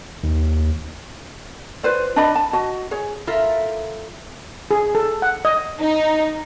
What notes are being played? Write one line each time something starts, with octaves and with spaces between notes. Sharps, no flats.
D#2
F4 B4 C5 D5
D4 D#5 B5
A5
F#4 D#5
G#4 C#5
E4 F4 A4 A#4 E5
G#4
A4
F#5
D#5
D#4